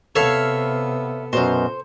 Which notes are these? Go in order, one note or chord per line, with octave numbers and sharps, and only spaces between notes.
C3 B3 A4 C#5 E5 F5
F#2 B2 C5